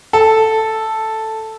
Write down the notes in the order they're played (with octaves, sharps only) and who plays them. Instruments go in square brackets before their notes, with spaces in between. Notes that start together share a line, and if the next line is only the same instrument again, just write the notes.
[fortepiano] A4